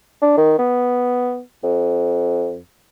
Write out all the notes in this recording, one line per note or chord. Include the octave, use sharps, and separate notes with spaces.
D4
D#3
B3
F2